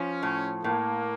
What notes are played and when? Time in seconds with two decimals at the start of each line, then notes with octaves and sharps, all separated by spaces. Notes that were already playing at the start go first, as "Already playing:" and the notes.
Already playing: F3 C#4
0.23 A2
0.64 A2 A#3